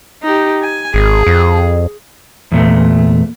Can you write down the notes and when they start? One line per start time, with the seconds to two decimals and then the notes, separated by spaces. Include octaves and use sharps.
0.23 D#4 G4
0.62 G#5
0.94 G#1 G#4
1.27 F2
2.52 E2 A#2 A3